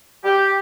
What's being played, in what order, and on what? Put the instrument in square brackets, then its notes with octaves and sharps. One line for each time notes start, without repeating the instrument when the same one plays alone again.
[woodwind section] G4